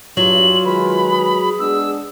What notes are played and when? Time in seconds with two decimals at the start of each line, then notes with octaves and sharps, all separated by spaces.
0.17 G2 F#3 F4 F#7
0.65 D#3 G#3 B4 B5
1.10 G#4
1.59 G#3 B3 D4 E6